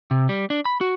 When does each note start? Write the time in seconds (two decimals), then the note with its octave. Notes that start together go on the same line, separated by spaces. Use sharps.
0.11 C3
0.29 G3
0.50 D4
0.65 B5
0.81 F#4